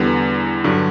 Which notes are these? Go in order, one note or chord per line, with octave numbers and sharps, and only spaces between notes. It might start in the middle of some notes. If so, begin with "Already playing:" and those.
Already playing: E2 D3 G3 B3
G2 D3 F#3